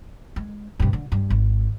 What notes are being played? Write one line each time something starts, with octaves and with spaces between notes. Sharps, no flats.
G#3
G2 C3
D3
G2
G#1